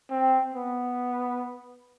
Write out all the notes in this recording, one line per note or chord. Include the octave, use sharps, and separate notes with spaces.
C4
B3